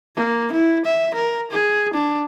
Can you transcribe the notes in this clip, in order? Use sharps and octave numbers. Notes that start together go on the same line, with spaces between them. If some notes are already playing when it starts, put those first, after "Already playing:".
A#3
E4
E5
A#4
G#4
D4